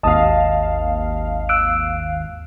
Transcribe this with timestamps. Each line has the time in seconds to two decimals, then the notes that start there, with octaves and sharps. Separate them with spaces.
0.03 G#1 D#2 D#5 F5 A5 D#6
1.49 E6 F#6 D7